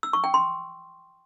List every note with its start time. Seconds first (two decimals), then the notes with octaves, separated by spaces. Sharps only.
0.03 E6
0.13 C#6
0.24 G5
0.34 C6